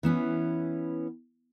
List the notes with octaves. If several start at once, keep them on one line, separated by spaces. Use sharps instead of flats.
E3 B3 C#4